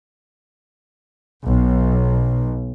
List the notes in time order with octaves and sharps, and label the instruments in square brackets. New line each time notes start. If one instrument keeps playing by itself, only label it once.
[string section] B1